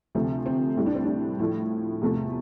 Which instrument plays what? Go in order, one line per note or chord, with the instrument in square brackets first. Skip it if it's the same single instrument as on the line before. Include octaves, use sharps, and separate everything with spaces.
[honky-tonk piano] D2 C3 F3 A3 C4
C4
A2 G3 E4
D4
C4
D4
A2 F3 A3 E4
E2 C3 F3 A3